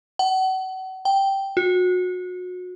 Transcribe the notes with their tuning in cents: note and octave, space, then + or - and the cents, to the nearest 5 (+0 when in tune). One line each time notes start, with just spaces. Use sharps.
F#5 +35
G5 -5
F#4 -30